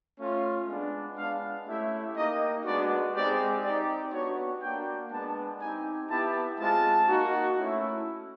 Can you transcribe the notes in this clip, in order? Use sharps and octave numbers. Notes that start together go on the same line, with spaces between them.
A3 C#4 F4
G#3 B3 D4
G#3 B3 D4 F5
A3 C#4 E4 G4 E5
A#3 D#4 G4 D#5
G#3 B3 D4 F#4 D5
G#3 C4 D#4 G4 D5
C4 D#4 G4 D5
B3 D4 F#4 C#5
A#3 D4 F#4 G5
G#3 B3 D4 A5
C4 D#4 G4 G#5
B3 E4 G4 A5
G#3 C4 F4 A5
A#3 D#4 F#4
A3 C#4 E4